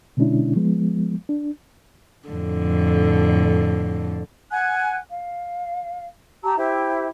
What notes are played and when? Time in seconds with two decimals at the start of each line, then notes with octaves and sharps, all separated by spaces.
0.17 B2 D3 G#3 C#4 D4 E4
0.56 F3 G#3 B3
1.29 D4
2.29 F2 A2 D3
4.51 F#5 G#5 F#6
5.10 F5
6.43 G4 A5 A#5 E6
6.57 E4 G4 C5 E5